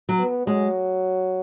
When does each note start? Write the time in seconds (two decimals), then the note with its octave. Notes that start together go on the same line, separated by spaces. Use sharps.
0.09 F#3
0.19 B3
0.47 F#3 G#3